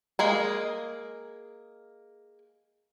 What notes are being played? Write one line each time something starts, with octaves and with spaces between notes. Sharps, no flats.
G#3 A#3 G#4